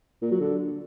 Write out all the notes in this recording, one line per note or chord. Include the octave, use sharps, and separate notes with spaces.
A#2
F#3
D3